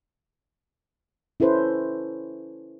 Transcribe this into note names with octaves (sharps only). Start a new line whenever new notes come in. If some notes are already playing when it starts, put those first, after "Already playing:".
C#4 E4 A4 B4 C5